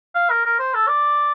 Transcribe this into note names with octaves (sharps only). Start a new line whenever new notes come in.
F5
A#4
A#4
C5
A4
D5